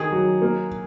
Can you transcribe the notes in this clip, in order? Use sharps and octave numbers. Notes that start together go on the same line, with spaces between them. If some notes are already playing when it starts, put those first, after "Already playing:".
Already playing: D#3 G#4
F#3
A#3